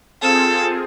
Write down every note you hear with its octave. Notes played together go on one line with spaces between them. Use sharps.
C4 F4 G#4 A4